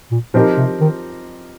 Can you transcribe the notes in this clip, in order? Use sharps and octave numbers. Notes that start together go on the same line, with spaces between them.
A#2
A#2 F3 C4 D#4 G4 A#4
C3
D#3